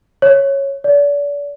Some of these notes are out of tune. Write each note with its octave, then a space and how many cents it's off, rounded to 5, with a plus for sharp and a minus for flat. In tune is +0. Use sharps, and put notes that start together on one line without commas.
C#5 -10
D5 -35